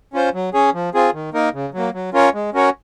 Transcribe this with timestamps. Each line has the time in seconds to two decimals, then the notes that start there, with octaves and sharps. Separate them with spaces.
0.13 C#4 F4 C5
0.34 F#3
0.54 C#4 G#4 C#5
0.74 F3
0.94 C4 F4 G#4
1.14 D#3
1.33 A#3 D#4 A#4
1.54 C#3
1.74 F#3 A#3
1.94 F#3
2.14 C#4 F4 A#4 C#5
2.34 G#3
2.54 C#4 F#4 A#4 C#5